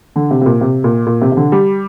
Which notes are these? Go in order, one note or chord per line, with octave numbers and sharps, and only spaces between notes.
D3
C3
C3
A#2
C3
A#2
A#2
C3
C3
D3
G3